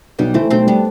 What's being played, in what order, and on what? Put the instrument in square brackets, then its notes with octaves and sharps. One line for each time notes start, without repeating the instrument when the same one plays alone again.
[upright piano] B1 [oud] G3 B3
[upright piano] E3 [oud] A3 C4
[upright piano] B1 [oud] A3 C4
[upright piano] G3 [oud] B3 D4